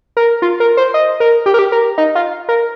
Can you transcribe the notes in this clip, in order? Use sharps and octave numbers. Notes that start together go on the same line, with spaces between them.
A#4
F4
A#4
C5
D#5
A#4
G4
A#4
G4
A#4
D#4
F4
A#4